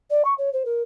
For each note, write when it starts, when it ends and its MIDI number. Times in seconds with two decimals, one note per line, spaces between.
0.10 0.22 74
0.24 0.34 85
0.38 0.52 73
0.53 0.63 72
0.65 0.82 70